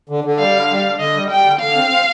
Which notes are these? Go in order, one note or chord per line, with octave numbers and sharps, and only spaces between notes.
D3
D3
G3 F5
D3
G3
D3
D3 D#5
G3
G3 G5
D3
D3 F5
C4
C4